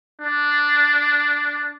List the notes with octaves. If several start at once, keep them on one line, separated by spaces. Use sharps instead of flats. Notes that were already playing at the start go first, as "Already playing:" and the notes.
D4